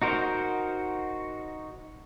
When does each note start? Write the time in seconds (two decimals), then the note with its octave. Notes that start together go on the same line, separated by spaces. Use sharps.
0.02 D#4 F#4 A#4 C5